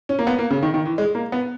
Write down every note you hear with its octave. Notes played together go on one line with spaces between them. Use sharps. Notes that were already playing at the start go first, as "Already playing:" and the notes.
C#4
A#3
B3
A#3
C#3
D#3
D#3
E3
G#3
A#3
B3